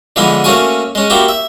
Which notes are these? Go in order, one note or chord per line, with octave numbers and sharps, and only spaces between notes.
D3 E3 F3 G#3 B3 E4
A3 A#3 C#4 F#4 G#5
G#3 C#4
A#3 E4 F#4 G4
E5